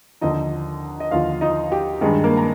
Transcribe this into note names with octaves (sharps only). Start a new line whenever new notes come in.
D#2 D3 F3 D#4 D#5
D#5
D#2 D3 F3 F4 F5
D#4 D#5
G4
G2 D#3 G#3 G#4
A#3 A#4
A#5